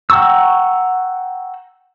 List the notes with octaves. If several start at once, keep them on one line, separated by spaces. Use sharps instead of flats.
F#5 G5 A#5 C#6 E6